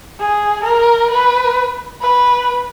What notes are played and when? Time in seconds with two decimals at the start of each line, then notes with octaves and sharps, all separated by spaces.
0.19 G#4
0.64 A#4
1.11 B4
2.01 B4